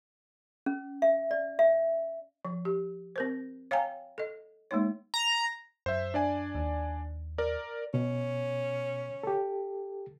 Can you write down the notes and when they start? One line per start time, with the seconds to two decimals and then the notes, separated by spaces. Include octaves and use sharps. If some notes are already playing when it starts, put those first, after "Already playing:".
0.66 C#4
1.02 E5
1.31 D5
1.59 E5
2.45 F3
2.65 G4
3.16 C4 A#4 C5
3.71 C#5 F5 G5 G#5 A#5
4.18 A4 D#5
4.71 G#3 A#3 D#4 C#5
5.14 A#5
5.86 F#2 C5 E5
6.14 D4 D5 G#5
6.55 D#2
7.38 A#4 D5
7.94 B2 C#4
9.23 G4 A4